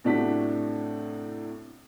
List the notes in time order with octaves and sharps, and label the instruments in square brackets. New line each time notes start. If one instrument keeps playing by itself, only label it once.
[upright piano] A2 C3 A3 D4 F#4 B6